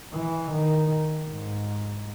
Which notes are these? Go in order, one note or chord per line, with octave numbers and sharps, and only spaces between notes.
E3
D#3
G#2